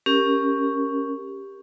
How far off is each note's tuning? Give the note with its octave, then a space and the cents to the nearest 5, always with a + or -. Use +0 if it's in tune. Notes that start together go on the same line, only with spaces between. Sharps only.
C#4 +0 G4 +10 A#4 +0